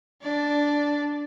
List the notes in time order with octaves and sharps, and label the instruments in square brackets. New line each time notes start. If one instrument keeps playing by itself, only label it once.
[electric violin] D4 D5